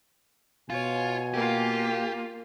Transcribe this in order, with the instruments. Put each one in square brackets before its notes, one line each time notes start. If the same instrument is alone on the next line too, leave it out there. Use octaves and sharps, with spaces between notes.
[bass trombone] B2 [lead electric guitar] F4 [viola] C#5 [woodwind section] G#5
[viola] A#3 F4 [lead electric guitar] G4